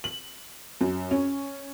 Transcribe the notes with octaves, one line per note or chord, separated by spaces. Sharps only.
F#7
F#2
C#4